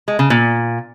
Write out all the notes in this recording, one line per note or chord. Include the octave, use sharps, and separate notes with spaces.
G#3
C#3
A#2